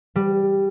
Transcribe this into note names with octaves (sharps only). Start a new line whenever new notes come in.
G3